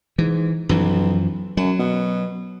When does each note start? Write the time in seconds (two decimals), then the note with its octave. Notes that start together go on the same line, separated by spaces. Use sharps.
0.18 G#2 E3
0.69 B1 F#2 E3 F3
1.57 F#2 F#3
1.79 B2